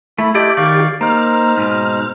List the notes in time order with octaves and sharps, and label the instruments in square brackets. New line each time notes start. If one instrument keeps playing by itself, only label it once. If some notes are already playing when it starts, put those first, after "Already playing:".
[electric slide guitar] A3 [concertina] E4 B5
[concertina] A3 D#5 [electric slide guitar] E4 D5 [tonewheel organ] G4
[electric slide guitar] D#3 D5 [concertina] F5 C#6
[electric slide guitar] A#3 [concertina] D#4 C5 A#5 [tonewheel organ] F6
[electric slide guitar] G#2 B2